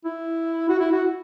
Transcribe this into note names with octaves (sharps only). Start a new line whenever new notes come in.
E4
F#4
E4
F#4